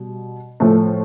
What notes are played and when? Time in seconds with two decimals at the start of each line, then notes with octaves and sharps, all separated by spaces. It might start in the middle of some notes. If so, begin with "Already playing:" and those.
Already playing: B2 G3
0.60 A2 F3 A3